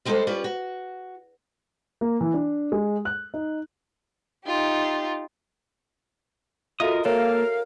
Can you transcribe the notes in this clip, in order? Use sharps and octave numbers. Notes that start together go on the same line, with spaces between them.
G3 G#3 D#4 F4 A4 C5
G3 C#4 F4 B4 D5
F#4
A#3
E3
D4
G#3
F#6
D#4
D#4 F4 G4
F4 F#4 A4 A#4 D#5 E5 D#6
A#3 A4 A#4 C#5 F5